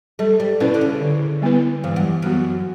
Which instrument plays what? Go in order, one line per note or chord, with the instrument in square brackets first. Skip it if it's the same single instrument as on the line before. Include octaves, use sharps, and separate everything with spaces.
[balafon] G3 [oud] A3
[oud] G3
[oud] B2 [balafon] C#4 E4 B4 D5
[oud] D3
C#3
[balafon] D3
G3 B3 E4 B4
[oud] G2 [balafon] E3
[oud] F#2
[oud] F#2 [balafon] G3 B3 F#4